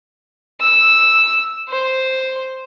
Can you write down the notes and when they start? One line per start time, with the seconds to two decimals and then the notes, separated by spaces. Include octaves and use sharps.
0.61 E6
1.69 C5